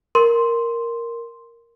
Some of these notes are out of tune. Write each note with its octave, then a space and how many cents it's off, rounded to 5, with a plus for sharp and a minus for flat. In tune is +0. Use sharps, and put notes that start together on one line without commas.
A#4 +0 C6 +0